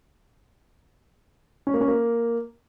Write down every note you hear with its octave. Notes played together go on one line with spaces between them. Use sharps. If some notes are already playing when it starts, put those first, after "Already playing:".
C#4
A#3
C#4
A#3